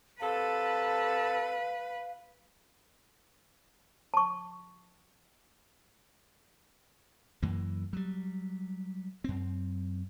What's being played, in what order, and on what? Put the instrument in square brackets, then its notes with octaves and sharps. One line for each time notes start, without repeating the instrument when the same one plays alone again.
[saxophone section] C3 A4 [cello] B4 [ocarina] F5 [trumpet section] A5
[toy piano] A5 C#6
[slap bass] F#2 E3 A#3
F#3 G3
F#2 C4